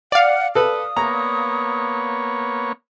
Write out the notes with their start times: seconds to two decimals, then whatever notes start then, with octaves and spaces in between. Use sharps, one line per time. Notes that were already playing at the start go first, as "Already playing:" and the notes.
0.12 D5 F5 F#5
0.55 A4 B4 D#6
0.97 A#3 B3 C#5 A#5